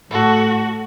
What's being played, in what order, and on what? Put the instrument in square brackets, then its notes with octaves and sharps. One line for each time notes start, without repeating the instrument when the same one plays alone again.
[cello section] A2 [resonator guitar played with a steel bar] A3 A4 [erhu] F#4